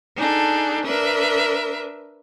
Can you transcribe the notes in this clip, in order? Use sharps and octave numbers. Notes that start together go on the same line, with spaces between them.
D4 D#4 G#4 A4
D4 A#4 B4 E5